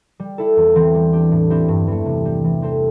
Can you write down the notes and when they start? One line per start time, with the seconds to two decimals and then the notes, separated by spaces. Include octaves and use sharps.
0.20 G3
0.38 E4 A4
0.57 E2
0.75 E3 C4
0.95 G3
1.13 D4 G4
1.31 A2
1.50 G3 C4 E4 G4
1.68 G2
1.87 E3 A3
2.06 C3
2.25 G3 C4
2.44 E3
2.62 C4 A4 C5